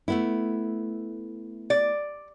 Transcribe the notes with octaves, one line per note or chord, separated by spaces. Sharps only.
A3 B3 E4
D5